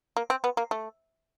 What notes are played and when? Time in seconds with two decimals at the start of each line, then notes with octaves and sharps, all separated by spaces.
0.17 A#3
0.30 C4
0.44 B3
0.57 A#3
0.71 A3